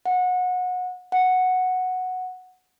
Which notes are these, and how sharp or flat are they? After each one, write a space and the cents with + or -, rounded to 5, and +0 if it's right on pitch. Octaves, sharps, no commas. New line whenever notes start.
F#5 -25
F#5 -5